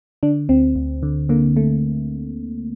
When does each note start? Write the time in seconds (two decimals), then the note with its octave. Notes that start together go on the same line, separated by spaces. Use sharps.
0.23 D3 D4
0.49 D2 C4
0.75 D2
1.03 D3
1.29 D3 A#3
1.56 A3